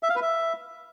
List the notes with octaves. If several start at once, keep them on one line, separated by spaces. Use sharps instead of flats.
E5
F5
B4
E5